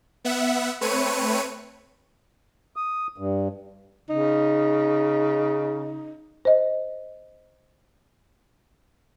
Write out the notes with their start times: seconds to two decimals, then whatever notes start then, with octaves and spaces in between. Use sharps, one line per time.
0.25 B3 E5 F#5
0.81 A3 C4 B4 C#5 C#7 D#7
2.76 D#6
3.18 G2
4.09 C#3 D#4
6.45 C5 D#5